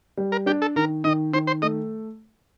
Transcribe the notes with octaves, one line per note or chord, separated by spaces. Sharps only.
G3
A#4
D4 G4
A4
D#3 A#4
D#3 D#5
D#3 C5
C5
A3 D#5